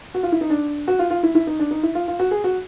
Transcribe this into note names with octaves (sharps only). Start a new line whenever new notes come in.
F#4
F4
E4
D#4
D4
F#4
F4
F4
E4
E4
D#4
D4
D#4
E4
F4
F4
F#4
G#4
F#4